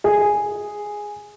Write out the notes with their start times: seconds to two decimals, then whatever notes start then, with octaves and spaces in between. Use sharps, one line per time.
0.04 G#4